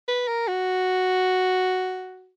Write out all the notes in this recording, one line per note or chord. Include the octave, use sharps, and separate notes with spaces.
B4
A#4
F#4